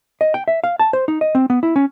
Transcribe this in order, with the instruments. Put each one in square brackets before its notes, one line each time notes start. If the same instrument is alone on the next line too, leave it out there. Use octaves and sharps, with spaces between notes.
[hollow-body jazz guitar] D#5
G5
E5
F5
A5
C5
D#4
D#5
C4
B3
E4
C#4